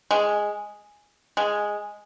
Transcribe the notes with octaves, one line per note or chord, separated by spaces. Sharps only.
G#3
G#3